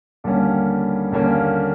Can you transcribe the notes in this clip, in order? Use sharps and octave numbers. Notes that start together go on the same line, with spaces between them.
D#2 D3 G3 A#3 C#4
D#2 D3 G3 A#3 C#4